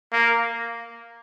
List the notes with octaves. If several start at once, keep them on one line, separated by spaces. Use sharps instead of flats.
A#3